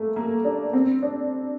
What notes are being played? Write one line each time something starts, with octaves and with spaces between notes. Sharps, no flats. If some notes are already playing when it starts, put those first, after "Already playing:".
Already playing: A3 A#3
A#3
D4
C4
D4